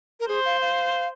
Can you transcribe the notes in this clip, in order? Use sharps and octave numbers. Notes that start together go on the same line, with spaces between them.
A#4
G#4 C5
F5
F5